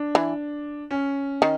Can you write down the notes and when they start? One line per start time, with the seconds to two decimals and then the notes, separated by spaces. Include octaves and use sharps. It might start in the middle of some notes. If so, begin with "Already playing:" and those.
Already playing: D4
0.15 E3
0.91 C#4
1.42 D#3